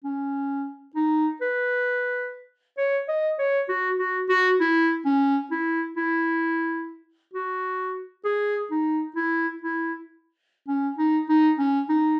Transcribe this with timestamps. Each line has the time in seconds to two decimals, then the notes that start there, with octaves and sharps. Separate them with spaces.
0.04 C#4
0.96 D#4
1.41 B4
2.78 C#5
3.08 D#5
3.39 C#5
3.69 F#4
3.99 F#4
4.29 F#4
4.60 E4
5.05 C#4
5.51 E4
5.97 E4
7.34 F#4
8.25 G#4
8.71 D#4
9.16 E4
9.62 E4
10.68 C#4
10.98 D#4
11.29 D#4
11.59 C#4
11.89 D#4